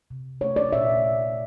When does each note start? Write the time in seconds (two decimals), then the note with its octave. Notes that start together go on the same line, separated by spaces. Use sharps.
0.11 C3
0.41 A3 C#5
0.56 D5
0.73 A#2 E5